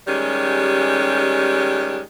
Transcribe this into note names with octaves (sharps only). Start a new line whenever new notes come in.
D#3 G3 G#3 C#4 G4